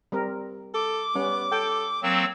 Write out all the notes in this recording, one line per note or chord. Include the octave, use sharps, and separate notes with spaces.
G3 C4 A#4
A4 D6
G3 B3 C#4
A4 G5
F#3 A#3 C4 E6